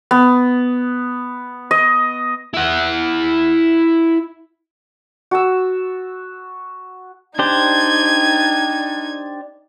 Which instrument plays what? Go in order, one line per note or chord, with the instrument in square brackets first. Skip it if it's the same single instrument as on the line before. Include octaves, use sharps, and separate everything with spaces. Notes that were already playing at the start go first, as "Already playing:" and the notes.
[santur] B3
D#5
[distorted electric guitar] E4 F#5
[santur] F#4 A5 E6
[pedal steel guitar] D4 G4 C5 [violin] D#4 G#6